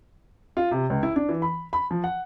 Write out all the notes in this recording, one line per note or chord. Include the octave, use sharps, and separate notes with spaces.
F4
C3
C#2
E4
D4
E3
B5
B5
F3
F#5